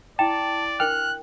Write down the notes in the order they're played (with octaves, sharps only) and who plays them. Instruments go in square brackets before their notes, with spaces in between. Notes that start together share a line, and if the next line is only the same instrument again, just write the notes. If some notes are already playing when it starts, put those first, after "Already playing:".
[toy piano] E4 G5 [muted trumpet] D5 [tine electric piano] A5
[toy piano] D4 A#4 G5 [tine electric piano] F6 [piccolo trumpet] F#6